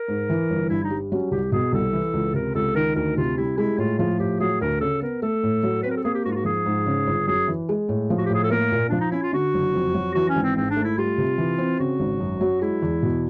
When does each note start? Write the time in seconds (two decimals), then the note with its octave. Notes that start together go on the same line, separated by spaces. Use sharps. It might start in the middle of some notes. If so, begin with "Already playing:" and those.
Already playing: A#4
0.08 G#2
0.30 E3
0.50 G1
0.69 G2 E4
0.84 D#4
0.90 G3
1.11 F#3 C#4
1.31 C2 G4
1.52 B2 G#4
1.72 C2 A4
1.93 E3
2.14 C#2
2.34 C3 A#4
2.55 C#2 A4
2.75 D#3 A#4
2.95 D2 A#4
3.16 C3 F4
3.37 G3 E4
3.58 G#3 E4
3.78 A2 F4
3.98 F3 F4
4.19 A2 G4
4.40 F#3 G#4
4.61 D2 A#4
4.80 C#3 A4
5.01 B3 A#4
5.22 A3 A4
5.43 A2
5.63 F#3
5.83 C4 B4
5.90 A#4
5.97 A4
6.04 A#3 G#4
6.14 G4
6.24 G#2 F#4
6.31 F4
6.35 F#4
6.45 F3 G#4
6.66 G#2
6.86 C#3
7.07 G1
7.27 F#2 G#4
7.48 E3
7.69 G#3
7.89 A2
8.10 F3
8.18 F#4
8.25 G4
8.30 A2 G#4
8.43 A4
8.50 A#3 A#4
8.72 A#2
8.89 F3 D4
9.00 D#4
9.11 C#4 E4
9.23 F4
9.33 D3 F#4
9.54 F#1
9.74 F2
9.94 F#3
10.15 E3 F#4
10.29 C#4
10.35 G#1
10.43 C4
10.56 G#2 C4
10.70 D4
10.76 A3
10.84 E4
10.98 G3 F4
11.18 C3
11.38 E3
11.58 C4
11.79 C#3 F#4
12.00 G#1
12.20 F#2
12.41 F#3
12.61 G#3 E4
12.82 E2
13.03 B2